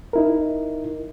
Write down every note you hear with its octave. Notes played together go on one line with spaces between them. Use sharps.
D#4 E4 A#4